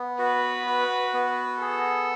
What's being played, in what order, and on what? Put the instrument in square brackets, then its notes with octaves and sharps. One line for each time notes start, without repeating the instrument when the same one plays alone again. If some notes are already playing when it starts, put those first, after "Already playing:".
Already playing: [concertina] B3
[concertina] F#4 [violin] B4
[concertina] F#4
B3
[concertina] G#4 [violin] A4